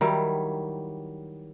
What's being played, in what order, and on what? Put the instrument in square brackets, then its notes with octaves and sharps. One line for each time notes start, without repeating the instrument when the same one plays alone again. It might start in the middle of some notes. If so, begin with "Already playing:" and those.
[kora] D#3 F#3 G3 E4